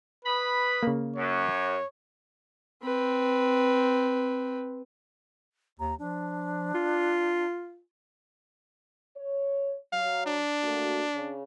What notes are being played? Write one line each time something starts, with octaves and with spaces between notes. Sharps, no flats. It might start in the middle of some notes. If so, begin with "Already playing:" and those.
B4 D#5 B5
C#3 A#3
F#2 C#5
C4 B4
D#2 A#5
F3 D4
F4
C#5
F#3 F5
D4
A3 A#3 F#4
C#3